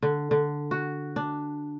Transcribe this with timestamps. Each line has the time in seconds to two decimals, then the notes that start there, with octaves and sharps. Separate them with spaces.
0.03 D3
0.31 D3
0.71 F#4
1.16 D4